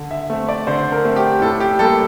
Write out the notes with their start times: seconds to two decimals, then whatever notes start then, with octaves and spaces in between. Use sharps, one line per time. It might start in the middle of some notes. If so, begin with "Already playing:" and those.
Already playing: D3
0.11 E5
0.30 A3 C4
0.49 D5
0.67 D3 C5
0.92 A#4
1.05 A3 C4
1.16 G4
1.42 A2 A4
1.60 G4
1.79 G3 A#3 A4